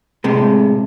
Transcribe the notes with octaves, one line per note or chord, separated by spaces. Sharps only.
A2 C3 G#3